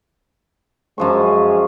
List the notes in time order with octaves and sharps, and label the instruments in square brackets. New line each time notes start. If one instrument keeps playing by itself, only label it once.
[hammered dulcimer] F#2 F3 C#6 [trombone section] G#3 G#4